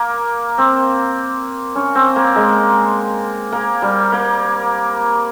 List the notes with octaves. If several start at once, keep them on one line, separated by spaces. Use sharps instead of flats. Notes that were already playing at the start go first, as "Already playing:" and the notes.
Already playing: A#3
C4
C#4
C4
A#3
G#3
A#3
G3
A#3